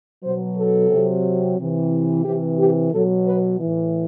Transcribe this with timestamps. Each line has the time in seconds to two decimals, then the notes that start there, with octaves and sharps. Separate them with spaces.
0.23 B2 F#3 C5
0.58 A4
0.90 C3
0.96 F#3
1.58 C3 E3
2.25 C3 E3 G4
2.59 G4
2.91 B2 F#3 A4
3.26 B4
3.59 A2 E3